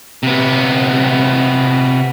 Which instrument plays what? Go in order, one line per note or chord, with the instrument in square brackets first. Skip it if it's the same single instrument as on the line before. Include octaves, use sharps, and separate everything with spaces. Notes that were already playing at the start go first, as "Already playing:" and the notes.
[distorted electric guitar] C3 B3